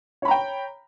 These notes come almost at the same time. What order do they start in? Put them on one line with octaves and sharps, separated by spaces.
C#5 B5 A#5 G5